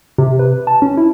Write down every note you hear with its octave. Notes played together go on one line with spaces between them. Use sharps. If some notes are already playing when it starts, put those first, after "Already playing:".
C3
B4
A5
C#4
E4